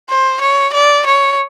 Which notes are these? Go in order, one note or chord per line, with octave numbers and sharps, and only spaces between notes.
C5
C#5
D5
C#5